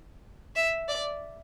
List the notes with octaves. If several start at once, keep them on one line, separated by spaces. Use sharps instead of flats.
E5
D5